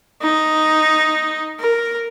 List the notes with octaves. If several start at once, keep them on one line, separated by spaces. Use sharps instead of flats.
D#4
A#4